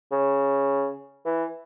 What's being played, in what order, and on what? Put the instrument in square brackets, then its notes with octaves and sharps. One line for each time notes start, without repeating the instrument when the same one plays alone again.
[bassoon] C#3
E3